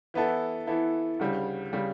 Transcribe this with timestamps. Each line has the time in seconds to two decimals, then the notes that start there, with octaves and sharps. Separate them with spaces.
0.14 E3 B3 E4 A4
0.67 E3 B3 E4 A4
1.19 D2 C#3 G3
1.73 C#3 G3